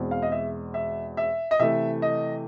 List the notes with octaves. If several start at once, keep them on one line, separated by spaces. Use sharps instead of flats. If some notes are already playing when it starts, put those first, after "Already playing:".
Already playing: E2 B2 G#3 C4
F5
D#5
E5
E5
E5
D#5
C3 E3 A3 E5
D#5